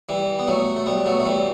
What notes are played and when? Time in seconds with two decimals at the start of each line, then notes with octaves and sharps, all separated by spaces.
0.09 E3 G3
0.39 B3
0.47 F#3 A3
0.76 A3
0.86 G3 B3
1.06 F#3 A3
1.20 A3
1.26 E3 G3